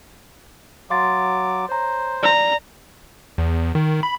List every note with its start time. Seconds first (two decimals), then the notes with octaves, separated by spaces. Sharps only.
0.90 F#3 F5 C6 D6 A6
1.69 C5 C#5 A#5
2.23 D5 A#5
3.38 E2
3.75 D#3
4.03 B5